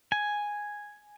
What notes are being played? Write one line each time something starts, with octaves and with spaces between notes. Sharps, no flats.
G#5